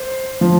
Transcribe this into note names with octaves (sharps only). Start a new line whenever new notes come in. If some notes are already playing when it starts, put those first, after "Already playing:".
Already playing: C5
F3